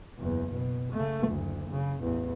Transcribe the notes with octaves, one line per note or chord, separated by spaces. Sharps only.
F#1 E2
B2
C#3 A3
F#1 D2
C#3
A1 E2